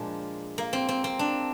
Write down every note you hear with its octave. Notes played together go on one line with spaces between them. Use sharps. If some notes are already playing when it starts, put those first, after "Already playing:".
Already playing: A#2 F3 G#3 D4
A#3
C4
C4
C4
D4